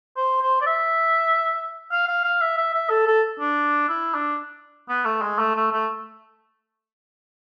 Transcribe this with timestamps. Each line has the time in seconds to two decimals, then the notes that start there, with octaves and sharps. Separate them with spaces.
0.17 C5
0.42 C5
0.61 D5
0.66 E5
1.92 F5
2.08 F5
2.24 F5
2.41 E5
2.58 E5
2.74 E5
2.90 A4
3.07 A4
3.40 D4
3.89 E4
4.15 D4
4.89 B3
5.05 A3
5.22 G#3
5.39 A3
5.56 A3
5.72 A3